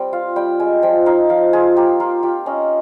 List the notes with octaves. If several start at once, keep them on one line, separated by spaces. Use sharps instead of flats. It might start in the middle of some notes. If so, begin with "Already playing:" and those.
Already playing: G3 C4 G5
F4 F5
G3 G5
G#3 G#5
F3 G5
D#4 F5
F3 F5
F4 G#4
A#3 G4
A#3 F4
F4 G4
C#4 D#5